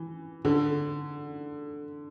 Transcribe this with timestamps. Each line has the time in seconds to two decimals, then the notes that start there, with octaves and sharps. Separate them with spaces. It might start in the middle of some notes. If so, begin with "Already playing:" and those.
Already playing: E3
0.45 D3